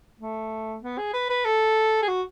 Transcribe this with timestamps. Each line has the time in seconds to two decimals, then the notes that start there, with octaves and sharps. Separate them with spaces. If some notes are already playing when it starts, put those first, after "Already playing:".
0.20 A3
0.82 B3
0.98 G#4
1.14 B4
1.29 B4
1.45 A4
2.02 G#4
2.08 F#4